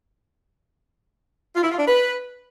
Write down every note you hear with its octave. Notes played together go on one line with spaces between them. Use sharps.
F4
E4
F4
D4
B4